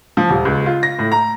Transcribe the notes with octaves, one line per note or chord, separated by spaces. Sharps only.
F3
D#1
C#2
F4
A#6
A2
A#5